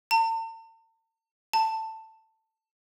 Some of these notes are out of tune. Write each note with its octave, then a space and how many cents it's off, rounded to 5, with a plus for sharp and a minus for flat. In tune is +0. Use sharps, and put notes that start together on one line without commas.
A5 +45
A5 +15